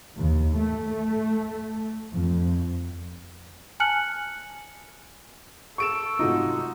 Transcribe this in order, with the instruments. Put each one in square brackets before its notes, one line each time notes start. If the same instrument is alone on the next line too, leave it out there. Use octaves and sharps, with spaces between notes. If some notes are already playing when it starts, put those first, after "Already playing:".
[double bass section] D#2
A3
F2
[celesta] G#5 A5 F6 F#6 C#7 F#7
[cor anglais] A4 [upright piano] C#6 D7 E7
[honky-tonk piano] G#2 C3 A3 [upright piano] D#4 [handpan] F4 F#4